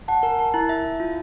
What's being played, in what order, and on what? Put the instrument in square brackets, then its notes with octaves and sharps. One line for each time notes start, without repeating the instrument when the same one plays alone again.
[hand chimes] F#5 [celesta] A5
[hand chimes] A#4 [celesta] G#5
[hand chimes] A#4 [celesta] A5
[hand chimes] E4 [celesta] A#5
[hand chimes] E5
E4
F4